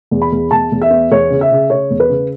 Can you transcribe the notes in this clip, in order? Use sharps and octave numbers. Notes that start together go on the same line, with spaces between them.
E2
B5
E2
E2 A5
E2
E5
B3
E2 C#5
C#3
E5
C#3
C#3 C#5
E2
B4
C#3